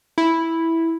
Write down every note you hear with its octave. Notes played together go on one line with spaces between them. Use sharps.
E4